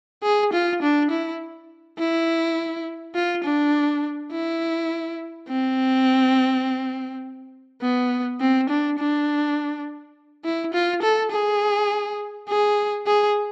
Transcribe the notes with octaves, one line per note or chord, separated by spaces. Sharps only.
G#4
F4
D4
E4
E4
F4
D4
E4
C4
B3
C4
D4
D4
E4
F4
A4
G#4
G#4
G#4